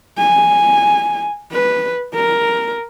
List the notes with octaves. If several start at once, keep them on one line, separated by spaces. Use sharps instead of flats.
G#5
B4
A#4